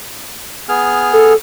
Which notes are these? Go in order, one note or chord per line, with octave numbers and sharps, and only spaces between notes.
B3 G#4 F6
A4